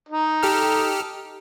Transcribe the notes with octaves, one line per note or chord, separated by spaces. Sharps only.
D#4
G4 A4 F6